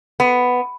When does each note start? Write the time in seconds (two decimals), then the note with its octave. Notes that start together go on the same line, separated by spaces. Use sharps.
0.20 B3